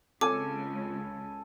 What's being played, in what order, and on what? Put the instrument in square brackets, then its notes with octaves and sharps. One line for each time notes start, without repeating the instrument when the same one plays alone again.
[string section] C#2 C#3 [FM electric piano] C4 F4 C#5 [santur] A4 G#5 [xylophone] D6